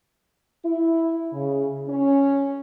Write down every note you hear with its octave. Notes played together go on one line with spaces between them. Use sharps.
E4
C#3
C#4